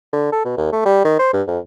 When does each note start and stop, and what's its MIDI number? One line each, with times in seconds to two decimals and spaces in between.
0.13 0.28 50
0.32 0.42 69
0.45 0.53 47
0.57 0.71 39
0.72 0.83 57
0.85 1.03 55
1.05 1.17 51
1.19 1.29 72
1.33 1.42 43
1.48 1.59 41